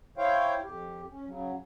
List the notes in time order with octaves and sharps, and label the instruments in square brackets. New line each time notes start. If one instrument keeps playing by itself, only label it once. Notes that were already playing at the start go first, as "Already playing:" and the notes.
[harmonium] E4 C5 C#5 F5 G5
F2 G4
C#4
C#3 F#3